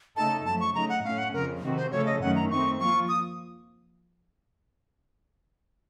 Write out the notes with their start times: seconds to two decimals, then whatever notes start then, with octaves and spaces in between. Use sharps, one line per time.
0.16 C#3 A3 D#4 A4 A5
0.45 F#2 F3 A3 A5
0.60 C#6
0.74 C#3 A3 D#4 A#5
0.89 F#5
1.04 A2 A3 C#4 F5
1.18 F#5
1.33 F2 C#3 F3 A#4
1.63 C3 D#3 A3 C4 F#4
1.77 C5
1.91 C#3 F3 A3 C#4 A4 C#5
2.06 D#5
2.21 F#2 D#3 F#3 A3 C#4 F#5
2.35 A#5
2.50 A3 C4 D#4 C#6
2.79 F3 A#3 F4 C#6
3.09 D#6